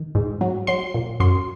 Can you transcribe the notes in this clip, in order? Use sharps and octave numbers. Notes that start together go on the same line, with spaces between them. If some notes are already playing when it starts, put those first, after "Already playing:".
Already playing: D#3
G#2
F#3
F#3 C6
A#2
F#2 C6